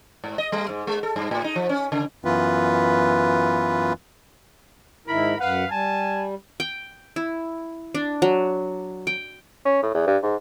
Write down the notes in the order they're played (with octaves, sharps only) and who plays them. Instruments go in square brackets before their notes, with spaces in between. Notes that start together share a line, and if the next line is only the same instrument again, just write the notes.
[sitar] G#2
D#5
G3
G#2
G#3
A4
G2
A2
D#4
F3
C#4
C#3
[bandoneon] F#2 E3 B3 F4 B4
[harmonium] G#2 D#3 E4 [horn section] A#4 B5
[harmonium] F#2 F#5 [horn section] B4 F5
[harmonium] G3 [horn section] G#5 A5
[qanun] G5
E4
D4
F#3
G5
[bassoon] C#4
A2
E2
G2
G#2